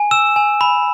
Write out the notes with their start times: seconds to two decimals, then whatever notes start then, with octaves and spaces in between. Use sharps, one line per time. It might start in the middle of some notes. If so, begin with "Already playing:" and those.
Already playing: G#5
0.11 E6 E7
0.36 G#5
0.61 B5